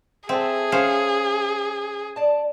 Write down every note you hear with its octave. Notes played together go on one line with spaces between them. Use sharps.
C4 G#4 A4 E5
C#4 C5 F5
D5 A5